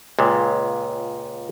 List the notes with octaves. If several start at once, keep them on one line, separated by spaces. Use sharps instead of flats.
C#2 A#2 G#3